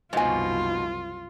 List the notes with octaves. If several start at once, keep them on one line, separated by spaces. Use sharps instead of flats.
F#1 C2 G#2 B2 F3 F4 G#5